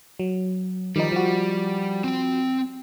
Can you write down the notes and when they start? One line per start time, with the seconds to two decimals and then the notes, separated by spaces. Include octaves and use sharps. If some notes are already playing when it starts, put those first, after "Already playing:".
0.19 F#3
0.96 D#3 F3 G3 D#4
1.12 F3 F#4
2.04 C4 G5